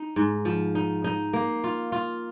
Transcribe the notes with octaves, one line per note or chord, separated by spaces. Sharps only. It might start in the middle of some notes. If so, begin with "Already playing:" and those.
Already playing: D#4
G#2
F3
D#4
D#4
A#3
F4
F4